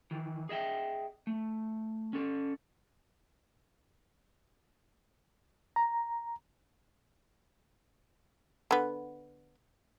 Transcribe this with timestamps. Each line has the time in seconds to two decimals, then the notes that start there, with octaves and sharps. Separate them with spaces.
0.11 D#3 E3
0.49 G#4 D#5 E5 G5
1.27 A3
2.13 C#4 A4
5.76 A#5
8.71 D3 B3